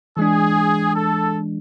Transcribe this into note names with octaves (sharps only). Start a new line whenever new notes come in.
E3 G#3 D4 G#4
A4